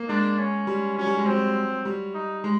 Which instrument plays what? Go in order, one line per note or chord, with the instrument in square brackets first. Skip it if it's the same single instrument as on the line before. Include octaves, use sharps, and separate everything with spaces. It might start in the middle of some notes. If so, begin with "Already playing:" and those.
Already playing: [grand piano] A#3
[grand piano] G#3 [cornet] D4
[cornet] C#4
[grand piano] G3
[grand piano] F#3 [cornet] C#4
[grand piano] G3
G#3
[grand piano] F#3 [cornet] C4
[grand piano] G3
[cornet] D#4
[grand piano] G#3